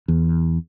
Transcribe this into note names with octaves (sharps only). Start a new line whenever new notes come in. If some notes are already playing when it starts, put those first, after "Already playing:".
E2